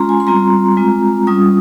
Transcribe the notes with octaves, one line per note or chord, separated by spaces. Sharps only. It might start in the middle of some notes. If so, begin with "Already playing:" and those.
Already playing: G#3 C#4 F4 A#5 C6
G#5
C6
G3 C4 F4 A#5
G#3 C4 F4
G3 C#4 F4 D#6